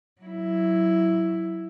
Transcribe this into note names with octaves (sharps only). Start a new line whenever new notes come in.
F#3 E4